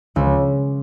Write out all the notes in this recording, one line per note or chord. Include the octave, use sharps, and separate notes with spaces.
C#2